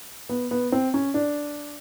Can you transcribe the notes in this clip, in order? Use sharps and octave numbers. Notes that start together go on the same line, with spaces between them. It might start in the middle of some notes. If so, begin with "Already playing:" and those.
B3
B3
C4
C#4
D4